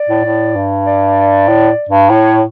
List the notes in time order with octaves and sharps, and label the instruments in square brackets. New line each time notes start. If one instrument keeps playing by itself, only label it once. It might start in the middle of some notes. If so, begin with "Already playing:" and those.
Already playing: [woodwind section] D5
[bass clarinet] A2
A2
G2
[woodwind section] D5
[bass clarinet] A2
G2
[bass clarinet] A2 [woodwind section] C#5